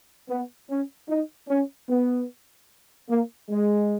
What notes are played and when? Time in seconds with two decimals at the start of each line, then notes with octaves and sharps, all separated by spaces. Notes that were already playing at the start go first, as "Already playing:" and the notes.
0.29 B3
0.69 C#4
1.08 D#4
1.48 C#4
1.88 B3
3.09 A#3
3.49 G#3